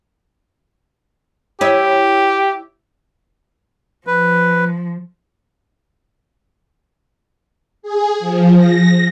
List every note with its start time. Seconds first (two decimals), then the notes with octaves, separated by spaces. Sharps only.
1.61 E4 G4 C#5 D#5
4.07 F3 B4
7.82 G#4
8.20 F3
8.56 A#6